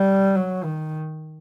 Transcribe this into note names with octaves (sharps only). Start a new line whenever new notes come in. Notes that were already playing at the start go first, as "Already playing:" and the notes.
Already playing: G3
F#3
D#3